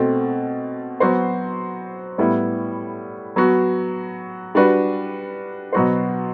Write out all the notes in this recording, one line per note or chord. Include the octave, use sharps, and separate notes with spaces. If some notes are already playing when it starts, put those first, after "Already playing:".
Already playing: B2 A3 C4
F#3 B3 F#4 C5
A2 G3 B3 E4
F#3 B3 F#4
G3 D4 F#4 B4
B2 F#3 B3 F#4 C5